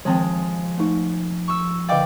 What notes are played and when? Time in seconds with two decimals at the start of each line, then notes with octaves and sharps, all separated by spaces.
0.05 D#3 F3 G#3 C4 G5
0.78 A3 D#4
1.48 C#6 E6
1.89 D3 D5 D#5 F5 G5 D6